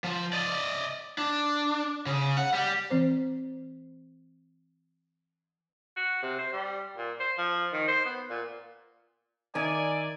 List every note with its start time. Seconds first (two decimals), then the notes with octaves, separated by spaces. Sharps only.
0.04 F3
0.33 D5 D#5
1.18 D4
2.06 C#3
2.37 F#5
2.54 G3 G4
2.91 E3 C4 C5
5.97 F#4
6.22 C3
6.39 C5
6.53 G3
6.97 A#2
7.20 C5
7.38 F3
7.73 D#3
7.88 C5
8.05 B3
8.30 A#2
9.55 D#3 D5 E5 G#5